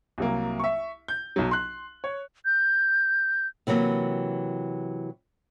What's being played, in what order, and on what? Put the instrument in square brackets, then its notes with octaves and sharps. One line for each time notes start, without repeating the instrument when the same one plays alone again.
[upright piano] C2 F#3 A#3
E5 C#6
G6
B1 F#3
C6 F#6
C#5
[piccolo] G6
[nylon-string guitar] C3 E3 F#3 A#3